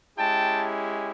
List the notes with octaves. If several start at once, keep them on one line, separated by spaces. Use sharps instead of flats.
G#3 C#4 E4 G4 G5 A5